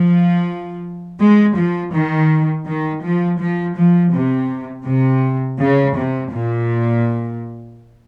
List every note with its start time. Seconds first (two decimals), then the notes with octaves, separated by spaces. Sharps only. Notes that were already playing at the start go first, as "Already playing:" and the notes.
Already playing: F3
1.20 G#3
1.56 F3
1.93 D#3
2.67 D#3
3.04 F3
3.40 F3
3.77 F3
4.14 C3
4.87 C3
5.61 C#3
5.97 C3
6.34 A#2